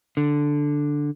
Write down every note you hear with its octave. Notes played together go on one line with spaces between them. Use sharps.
D3